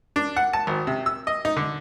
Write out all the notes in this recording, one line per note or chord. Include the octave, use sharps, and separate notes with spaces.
D4
F#5
A5
G#1
C3
E6
D#5
D#4
D3